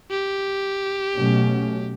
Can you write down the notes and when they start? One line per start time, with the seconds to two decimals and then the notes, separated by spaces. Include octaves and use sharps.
0.10 G4
1.17 B2 F#3 A3 C#4